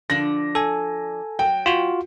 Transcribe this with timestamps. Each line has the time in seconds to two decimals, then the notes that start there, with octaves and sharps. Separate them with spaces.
0.10 D3 F3 D4 A#6
0.55 A4 G#5
1.39 F#3 G5
1.66 F4 F#4